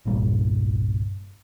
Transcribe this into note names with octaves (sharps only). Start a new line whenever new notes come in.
G1 C2 G2 A#2